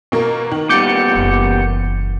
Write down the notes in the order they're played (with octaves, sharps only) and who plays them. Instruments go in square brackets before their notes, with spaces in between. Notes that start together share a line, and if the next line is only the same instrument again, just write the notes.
[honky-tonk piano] B2 A#3
D#3
[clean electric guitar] A#2 G3 B3 [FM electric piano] D6 G6 C#7
[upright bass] F#1 E3